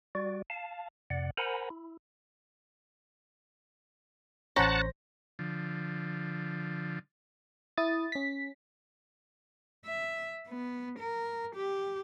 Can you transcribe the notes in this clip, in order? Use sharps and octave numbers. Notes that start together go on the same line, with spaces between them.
G3 F#4 D5
F5 A5
F2 C3 D5 F#5
A#4 C5 F#5 G#5 A#5 B5
E4
A1 C#4 C5 F#5 A5 A#5 A#6
D3 F3
E4 D#6 A6
C#4 B6
E5
B3
A#4
G4